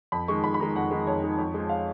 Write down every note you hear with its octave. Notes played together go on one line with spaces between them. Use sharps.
F2 B5
D#3 G#3 C#6
F2 B5
B5
D#3 G#3 A#5
F2 F#5
D#3 G#3
F2 C#5
D#3 G#3
F2
F3 G#3
F5